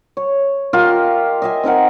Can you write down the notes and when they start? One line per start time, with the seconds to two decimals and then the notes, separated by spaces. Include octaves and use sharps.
0.17 C#5
0.73 F4 G4 A#4 D#5
1.42 D#5 E5 G#5
1.63 C4 D#4 A#4 F#5